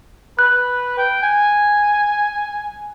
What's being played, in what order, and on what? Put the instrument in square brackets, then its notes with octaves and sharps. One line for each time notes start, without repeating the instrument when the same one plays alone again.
[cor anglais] B4 [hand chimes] F#6
[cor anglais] G5
G#5